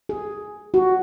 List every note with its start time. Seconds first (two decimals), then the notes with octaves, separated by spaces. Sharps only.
0.09 G#4
0.74 F#4